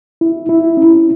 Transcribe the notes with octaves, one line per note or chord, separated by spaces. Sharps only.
E4
E4
C#4